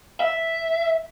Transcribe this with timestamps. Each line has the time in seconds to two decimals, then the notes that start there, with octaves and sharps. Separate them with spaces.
0.20 E5